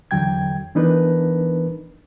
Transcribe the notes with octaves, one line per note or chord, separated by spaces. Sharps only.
E2 D3 F#3 G5 G#6
E3 B3 D4 D#4 A#4 B4